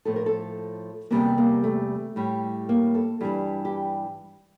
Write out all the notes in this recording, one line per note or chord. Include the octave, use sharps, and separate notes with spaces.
A2 F3 A4
A#4
A4
E2 C3 G3 A#3
A#3
A3
A2 G3
A#3
A4
G2 E3 G3 G4
G4